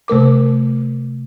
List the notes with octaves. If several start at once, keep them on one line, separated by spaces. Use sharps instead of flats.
C3 A3 A#4 D6